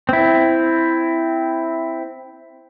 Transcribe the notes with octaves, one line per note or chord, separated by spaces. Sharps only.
C4 E4